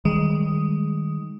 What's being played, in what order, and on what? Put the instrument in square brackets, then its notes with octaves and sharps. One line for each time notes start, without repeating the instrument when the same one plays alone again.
[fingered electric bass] D#3 G3 [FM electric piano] G#3